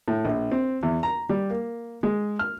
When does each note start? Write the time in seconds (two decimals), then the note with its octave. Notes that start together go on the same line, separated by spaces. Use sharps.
0.08 A2
0.25 A#1
0.52 C4
0.83 E2
1.03 A#5
1.29 G3
1.50 A#3
2.03 G#3
2.39 F6